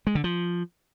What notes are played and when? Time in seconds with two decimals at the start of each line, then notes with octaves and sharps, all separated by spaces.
0.07 G#3
0.15 D3
0.24 F3